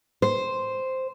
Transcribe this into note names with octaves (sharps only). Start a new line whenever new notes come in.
C5